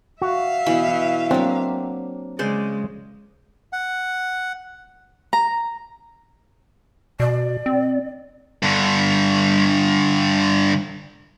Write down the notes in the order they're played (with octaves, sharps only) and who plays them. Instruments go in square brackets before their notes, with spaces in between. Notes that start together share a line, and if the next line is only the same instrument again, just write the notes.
[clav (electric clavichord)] F#4 [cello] E5 F5
[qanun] B2 E3 B5
[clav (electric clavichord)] F#3 C4 [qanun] A#3 D4
[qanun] C#3 C5 D5 [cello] G#3
[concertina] F#5
[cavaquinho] A#5
[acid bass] B2 [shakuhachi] D5
[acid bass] C4
[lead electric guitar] G2 D3